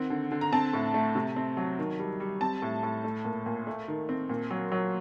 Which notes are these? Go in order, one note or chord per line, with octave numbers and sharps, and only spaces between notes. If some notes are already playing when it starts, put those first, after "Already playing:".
Already playing: D#3 C4 F#5
D3
D3
A#5
C4 A5
A2
A3
C3
C4
F#3
D#3
G3
G3
C4 A5
A2
A2
A3
A#2
A#2
A3
D#3
C4
A#2
F#3
F#3